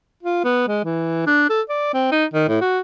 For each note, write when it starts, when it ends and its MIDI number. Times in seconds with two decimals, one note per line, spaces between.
0.23 0.44 65
0.44 0.67 59
0.68 0.82 56
0.85 1.23 52
1.27 1.45 62
1.50 1.62 69
1.69 1.90 74
1.94 2.11 60
2.12 2.25 63
2.34 2.46 51
2.48 2.59 45
2.61 2.80 66